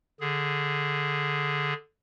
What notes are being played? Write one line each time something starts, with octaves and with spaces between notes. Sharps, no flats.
D3 G#4